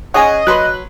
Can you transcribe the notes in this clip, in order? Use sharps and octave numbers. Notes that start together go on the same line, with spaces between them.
C#4 G#4 C#5 D#5 F#5 G#5
F#3 B4 C6 F#6